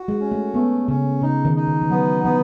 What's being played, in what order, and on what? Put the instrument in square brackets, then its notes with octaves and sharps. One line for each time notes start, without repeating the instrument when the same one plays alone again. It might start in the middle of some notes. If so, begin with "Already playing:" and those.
Already playing: [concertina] F#4
[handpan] G#3
[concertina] C#4
[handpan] A3
[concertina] A3 [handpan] B3
[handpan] C#3 [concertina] C#4
[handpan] C#3 [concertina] D#4
[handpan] D#3
[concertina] D#4
[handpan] D#3
E3
[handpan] F#3 [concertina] B3
[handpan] E3 [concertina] B3